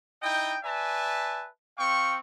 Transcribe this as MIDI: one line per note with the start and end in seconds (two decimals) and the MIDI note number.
0.23 0.58 63
0.23 0.58 64
0.23 0.58 75
0.23 0.58 79
0.64 1.48 71
0.64 1.48 74
0.64 1.48 76
0.64 1.48 80
0.64 1.48 81
1.78 2.18 60
1.78 2.18 77
1.78 2.18 79
1.78 2.18 85